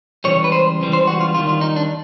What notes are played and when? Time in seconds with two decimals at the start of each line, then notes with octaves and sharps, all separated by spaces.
0.24 C#2 C#3 E3 G3 C#5
0.44 B4
0.52 C5
0.79 C#2 C#3 E3 G3
0.93 C5
1.07 F#4
1.20 F4
1.35 D#2 D#3 G3 F4
1.49 F4
1.61 D#4
1.76 D4